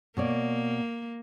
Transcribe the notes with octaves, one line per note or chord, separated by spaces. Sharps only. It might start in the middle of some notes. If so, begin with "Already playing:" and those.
B2 A#3 C#5 D5